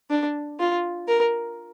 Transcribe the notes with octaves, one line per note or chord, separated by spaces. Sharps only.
D4
F4
A#4